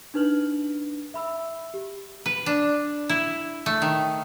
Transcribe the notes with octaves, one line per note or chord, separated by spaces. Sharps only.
D4 D#4 B4 F6 F#7
E5 B5 E6
G4
B4
D4
E4
A3
D#3